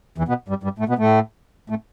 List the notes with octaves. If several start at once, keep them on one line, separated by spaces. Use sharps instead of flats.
E2 E3
B2 B3
G2 G3
G2 G3
A2 A3
B2 B3
A2 A3
A2 A3